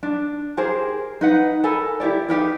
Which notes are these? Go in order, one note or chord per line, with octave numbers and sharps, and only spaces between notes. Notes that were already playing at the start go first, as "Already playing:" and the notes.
D4
G4 G#4 A#4 C5
D#4 B4 F#5
A4 A#4 G#5 B5
E4 G4 C#5 D5
D#4 G4 A#4 B4